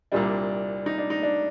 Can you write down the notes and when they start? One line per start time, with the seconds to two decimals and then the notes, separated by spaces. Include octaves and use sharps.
0.12 C2 A#2 G3 D4
0.86 D#4
0.98 D4
1.10 D#4
1.23 D4